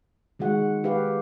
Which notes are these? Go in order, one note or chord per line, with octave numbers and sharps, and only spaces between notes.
D#3 G#3 F#4 F#5
G4 B4 F5